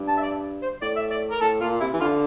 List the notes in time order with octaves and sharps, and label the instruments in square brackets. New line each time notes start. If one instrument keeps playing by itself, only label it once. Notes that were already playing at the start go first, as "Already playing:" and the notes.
Already playing: [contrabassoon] G2
[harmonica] A5
E5
D5
C5
[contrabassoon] A2 [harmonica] D5
[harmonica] E5
D5
A#4
[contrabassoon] A2 [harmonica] A4
[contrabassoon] A#2 [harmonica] F4
[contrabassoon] C3 [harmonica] E4
[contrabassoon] E3
[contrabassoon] D3 [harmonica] F4